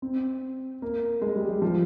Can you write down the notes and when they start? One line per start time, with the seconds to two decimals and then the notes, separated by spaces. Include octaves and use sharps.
0.02 C4
0.82 A#3
1.22 G#3
1.36 G3
1.49 G3
1.62 F3